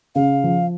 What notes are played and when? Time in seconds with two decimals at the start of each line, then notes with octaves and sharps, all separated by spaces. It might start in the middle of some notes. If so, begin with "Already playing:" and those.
0.15 C#3 F5
0.44 F3